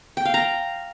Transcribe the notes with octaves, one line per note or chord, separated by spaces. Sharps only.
G5
F5
A#5